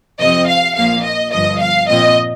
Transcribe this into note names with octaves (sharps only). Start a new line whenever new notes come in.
F2 C3 F3 C4 D#5
F5
A#1 A#2 F3 A#3 F5
D#5
G1 G2 F3 D#5
F5
A#1 A#2 F3 C4 D#5